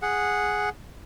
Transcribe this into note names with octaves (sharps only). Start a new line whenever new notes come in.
G#4 F#5